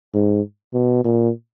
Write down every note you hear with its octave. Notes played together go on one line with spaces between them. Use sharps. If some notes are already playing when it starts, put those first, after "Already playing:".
G#2
B2
A#2